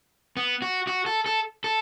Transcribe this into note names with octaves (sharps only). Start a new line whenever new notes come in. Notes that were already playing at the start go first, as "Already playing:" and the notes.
B3
F#4
F#4
A4
A4
A4